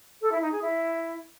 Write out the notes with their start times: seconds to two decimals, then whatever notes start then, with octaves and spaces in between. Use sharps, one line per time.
0.22 A4
0.32 E4
0.42 D#4
0.52 G#4
0.62 E4